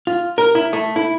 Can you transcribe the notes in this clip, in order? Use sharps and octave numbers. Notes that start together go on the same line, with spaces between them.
F4
A#4
E4
A3
E4